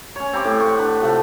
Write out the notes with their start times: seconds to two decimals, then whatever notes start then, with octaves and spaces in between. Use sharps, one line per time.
0.16 C#4 C#5
0.33 C4 G4 B5 D6
0.44 A2
0.60 F#5 C#6
0.79 D4 B4
1.00 C3 F3 A3